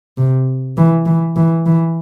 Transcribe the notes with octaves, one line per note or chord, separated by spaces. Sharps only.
C3
E3
E3
E3
E3